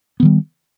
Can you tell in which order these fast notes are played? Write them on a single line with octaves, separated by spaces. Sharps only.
B3 D#3 G3